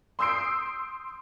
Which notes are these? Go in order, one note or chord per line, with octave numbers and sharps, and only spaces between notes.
C6 D#6 E6 G6 C7 D7